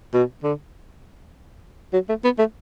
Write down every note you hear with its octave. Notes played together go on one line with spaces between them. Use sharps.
B2
D3
F#3
A3
B3
A3